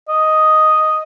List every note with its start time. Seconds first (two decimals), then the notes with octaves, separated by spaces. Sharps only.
0.09 D#5